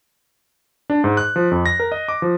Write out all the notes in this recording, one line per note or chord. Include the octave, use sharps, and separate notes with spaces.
D4
G#2
F#6
F3
F2
A#6
A#4
D#5
D6
F3